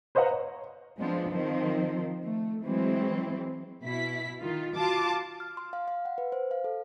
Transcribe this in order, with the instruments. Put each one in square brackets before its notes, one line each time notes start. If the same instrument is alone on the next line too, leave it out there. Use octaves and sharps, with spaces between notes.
[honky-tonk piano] B4 C5 D#5 F5 F#5 A#5
C#5
[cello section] F3 G#3 B3 C4 D4
D#3 F3 C4
A3
E3 F#3 G#3 C4
[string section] B2 E4 B6
D#3 F4
F4 F#4 A5 D6
[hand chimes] F6
C6
F5
F5
F#5
B4
C5
F5
A4